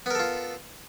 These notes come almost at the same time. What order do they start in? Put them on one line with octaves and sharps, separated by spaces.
B3 A#4 A4 F4